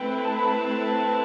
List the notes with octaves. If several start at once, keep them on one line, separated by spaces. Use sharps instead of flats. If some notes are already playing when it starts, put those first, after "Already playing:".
Already playing: A3 C4 E4 B4 G5
A5
B5
A5